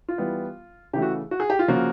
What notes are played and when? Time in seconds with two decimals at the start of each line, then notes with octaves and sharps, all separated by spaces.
0.08 F4
0.18 E3 G3 B3
0.93 C#3 E3 A3 G4
1.02 F#4
1.31 F#4
1.40 G#4
1.50 G4
1.59 F4
1.68 C#3 F3 A#3 F#4